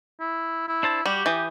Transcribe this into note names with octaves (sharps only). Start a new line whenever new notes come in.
E4
E4
D4 C5 A5
G3 F#4 G4
E3 D#6 G6